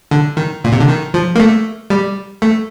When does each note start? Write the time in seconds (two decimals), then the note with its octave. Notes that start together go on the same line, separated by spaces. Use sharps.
0.11 D3
0.37 D#3
0.64 A#2
0.72 C3
0.80 D3
0.88 D#3
1.14 F3
1.35 A#3
1.40 A3
1.90 G3
2.42 A3